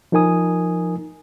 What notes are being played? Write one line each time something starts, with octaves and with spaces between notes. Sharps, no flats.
F3 D#4 A#4 G#5 D#6